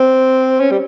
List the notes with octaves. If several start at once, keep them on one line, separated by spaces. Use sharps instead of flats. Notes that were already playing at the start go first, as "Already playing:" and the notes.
Already playing: C4
C#4
G3